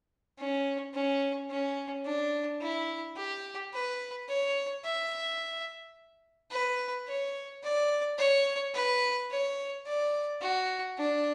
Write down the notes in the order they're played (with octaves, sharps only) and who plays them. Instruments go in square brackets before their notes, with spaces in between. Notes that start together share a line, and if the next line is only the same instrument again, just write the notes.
[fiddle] C#4
C#4
C#4
D4
E4
G4
B4
C#5
E5
B4
C#5
D5
C#5
B4
C#5
D5
F#4
D4